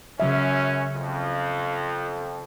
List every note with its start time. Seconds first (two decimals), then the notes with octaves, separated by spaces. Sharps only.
0.20 F#2 C#3 F#3 C#4 E5
0.95 F2